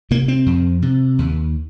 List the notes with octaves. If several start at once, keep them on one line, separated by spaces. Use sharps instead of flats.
C3 A#3
C4
F2
C3
D#2